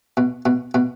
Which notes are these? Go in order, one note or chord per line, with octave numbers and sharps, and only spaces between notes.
B2
B2
B2